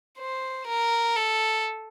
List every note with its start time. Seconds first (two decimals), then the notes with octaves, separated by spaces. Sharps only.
0.18 C5
0.67 A#4
1.16 A4